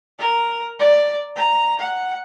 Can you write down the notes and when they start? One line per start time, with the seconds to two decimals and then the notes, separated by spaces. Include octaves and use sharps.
0.19 A#4
0.79 D5
1.35 A#5
1.79 F#5